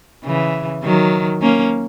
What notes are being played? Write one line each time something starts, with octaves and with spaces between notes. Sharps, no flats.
C#3 E3
D#3 F#3
A#3 C#4